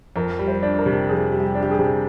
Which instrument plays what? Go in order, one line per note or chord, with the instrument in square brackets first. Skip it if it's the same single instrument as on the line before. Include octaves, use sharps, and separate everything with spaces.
[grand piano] F2 [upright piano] A#4
[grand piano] G3
[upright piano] C5
[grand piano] D4
[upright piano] A#4
[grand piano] C3
[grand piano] F2 [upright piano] G#4
[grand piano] G3
[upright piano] G4
[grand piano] D4
[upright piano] G4
G#4
[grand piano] C3